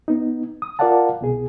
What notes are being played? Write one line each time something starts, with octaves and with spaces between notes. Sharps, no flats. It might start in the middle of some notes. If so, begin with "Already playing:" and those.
B3 D#4
D#6
F4 A#4 D5 F5 F#5 A5
C2 B2 G#4